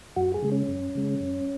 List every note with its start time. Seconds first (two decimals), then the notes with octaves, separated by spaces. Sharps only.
0.16 F#2 F#4
0.34 G#4
0.42 C#3 G#3
0.52 C#4
0.68 F#2
0.95 C#3 G#3
1.20 F#2